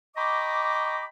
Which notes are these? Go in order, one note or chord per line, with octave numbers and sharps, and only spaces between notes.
D#5 G5 A#5 B5 C#6 D6